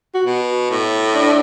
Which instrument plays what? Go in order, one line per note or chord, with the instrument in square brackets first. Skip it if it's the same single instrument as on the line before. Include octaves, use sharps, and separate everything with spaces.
[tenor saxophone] F#4
[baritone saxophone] B2
A2
[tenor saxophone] D4